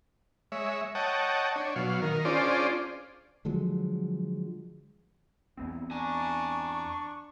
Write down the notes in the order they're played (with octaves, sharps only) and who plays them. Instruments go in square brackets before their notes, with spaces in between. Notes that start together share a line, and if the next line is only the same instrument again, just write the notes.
[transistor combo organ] G#3 C#5 E5
C#5 D#5 F#5 G5 A5
D4 C#5
B2 F#3 F5
D#3 A#4
C#4 D4 F4 G#4 C5 D5
[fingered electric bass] D3 F3 F#3 G#3
[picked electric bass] E2 B3 C4
[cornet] D4 [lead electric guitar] G#5 A#5 [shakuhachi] C#6